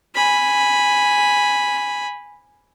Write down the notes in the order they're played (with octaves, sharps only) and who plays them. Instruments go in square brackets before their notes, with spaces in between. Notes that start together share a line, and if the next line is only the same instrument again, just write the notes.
[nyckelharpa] G#5 B5